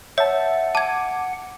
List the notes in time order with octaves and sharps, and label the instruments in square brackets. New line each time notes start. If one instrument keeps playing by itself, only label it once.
[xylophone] C#5 [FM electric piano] E5 A5 [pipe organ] F#5
[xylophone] A5 G#6 [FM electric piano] D6